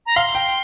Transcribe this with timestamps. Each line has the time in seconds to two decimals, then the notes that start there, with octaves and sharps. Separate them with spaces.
0.06 A#5
0.15 F5 C6
0.35 G5